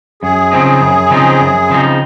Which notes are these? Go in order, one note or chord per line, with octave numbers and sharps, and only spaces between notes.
F#2 G#4
C#3 F3 C4 D#4
F#2
C#3 F3 C4 D#4
F#2
C#3 F3 C4 D#4